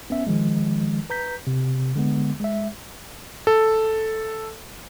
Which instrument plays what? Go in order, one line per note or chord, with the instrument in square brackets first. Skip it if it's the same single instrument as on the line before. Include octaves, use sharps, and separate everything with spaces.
[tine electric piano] B3 C#4 E5
D#3 F3 G#3
B4 A#5 G6 B6
C3
D3 G#3 B3
G#3 E5
[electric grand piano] A4